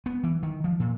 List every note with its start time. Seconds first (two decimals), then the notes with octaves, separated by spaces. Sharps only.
0.06 B3
0.24 E3
0.43 D#3
0.64 F3
0.80 A#2